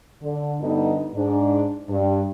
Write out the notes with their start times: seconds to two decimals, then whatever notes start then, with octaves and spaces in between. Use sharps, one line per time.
0.23 D3
0.61 D2 G2 D3 B3 D#4
1.14 G#2 D4
1.89 G2